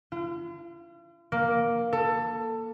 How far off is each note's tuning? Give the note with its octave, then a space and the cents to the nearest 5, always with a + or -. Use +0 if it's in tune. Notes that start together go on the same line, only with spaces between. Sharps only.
F4 -45
A#3 +5
A4 +20